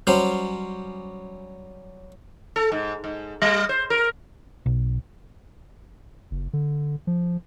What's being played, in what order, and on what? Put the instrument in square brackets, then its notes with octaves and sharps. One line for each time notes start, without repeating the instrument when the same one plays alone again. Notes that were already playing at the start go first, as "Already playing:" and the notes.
[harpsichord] F#3 G3 C#4 C5
[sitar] A4
G#2
G#2
G3
C5
A#4
[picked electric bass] B1
[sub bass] F#1
D3
F3